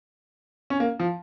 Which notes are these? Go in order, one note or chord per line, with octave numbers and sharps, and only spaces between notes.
C#4
A#3
F3